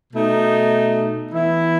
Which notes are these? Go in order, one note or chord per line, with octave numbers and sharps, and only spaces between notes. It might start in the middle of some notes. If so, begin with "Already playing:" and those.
B2 A3 D#4
E3 B3 E4